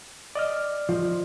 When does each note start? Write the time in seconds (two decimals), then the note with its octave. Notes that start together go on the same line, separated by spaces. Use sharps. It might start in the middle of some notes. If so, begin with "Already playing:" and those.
0.35 D5 D#5 F6
0.89 F3